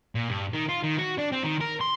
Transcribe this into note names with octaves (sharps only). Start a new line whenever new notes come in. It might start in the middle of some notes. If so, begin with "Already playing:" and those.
A#2
G2
D#3
F4
D#3
F#4
D4
C4
D#3
A#4
C6